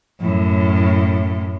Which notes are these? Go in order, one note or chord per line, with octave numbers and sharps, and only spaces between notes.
F#2 A2